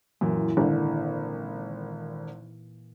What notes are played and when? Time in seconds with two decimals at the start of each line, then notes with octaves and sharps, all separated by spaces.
0.21 F#2 A#2 E3
0.57 G#1 D3